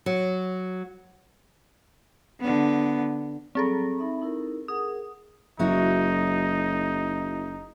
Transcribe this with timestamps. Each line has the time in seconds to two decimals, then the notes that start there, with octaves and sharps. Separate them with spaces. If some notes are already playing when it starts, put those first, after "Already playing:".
0.06 F#3
2.40 D3 B3
3.55 F#3 G3 C4 G#4 A4
3.98 D#4 E5 B5
4.21 D#4 E4 A#4
4.68 G#4 A#4 F#5 D#6
5.59 F#1 F#3 D#4 E4 F#4